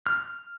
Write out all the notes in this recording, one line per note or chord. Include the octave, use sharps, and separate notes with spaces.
F6